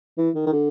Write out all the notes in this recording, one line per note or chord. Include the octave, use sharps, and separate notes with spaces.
E3
D#3
D#3
D3